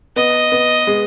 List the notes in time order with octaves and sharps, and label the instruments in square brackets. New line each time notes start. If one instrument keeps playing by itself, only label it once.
[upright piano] B3 [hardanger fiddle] D#5
[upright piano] B3
G#3